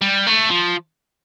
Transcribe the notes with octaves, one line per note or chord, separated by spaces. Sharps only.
G3
A3
F3